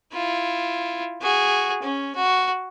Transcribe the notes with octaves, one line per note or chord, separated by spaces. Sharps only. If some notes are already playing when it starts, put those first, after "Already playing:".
E4 F4
F#4 G#4
C#4
F#4